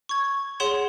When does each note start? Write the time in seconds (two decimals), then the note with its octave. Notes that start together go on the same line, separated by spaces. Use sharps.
0.09 C#6 G#6
0.60 G#4 C#5 F#5 C6 E7